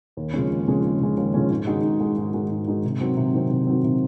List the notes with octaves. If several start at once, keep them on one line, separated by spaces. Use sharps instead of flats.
D#2
C#3 F3 G#3 C#4
D#2
C#3 F3 G#3 C#4
D#2
C#3 F3 G#3 C#4
D#2
C#3 F3 G#3 C#4
G#2
D#3 G#3 D#4 F#4
G#2
D#3 G#3 D#4 F#4
G#2
D#3 G#3 D#4 F#4
G#2
D#3 G#3 D#4 F#4
C3
D#3 F#3 C4
C3
D#3 F#3 C4
C3
D#3 F#3 C4
C3